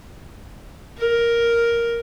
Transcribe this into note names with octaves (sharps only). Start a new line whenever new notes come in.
A#4